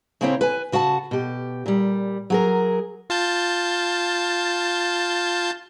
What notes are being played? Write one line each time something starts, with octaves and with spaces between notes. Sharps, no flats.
C#3 A#3 C4 E4 C5 C#5
B4 G#5
C#3 F#4 F#5 A5
B2 G4
A#2 G3
F#3 G#4 A#4
F4 A5 G6